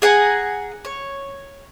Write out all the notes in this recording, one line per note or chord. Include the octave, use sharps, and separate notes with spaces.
G#4 F#5 G#5 A#5
C#5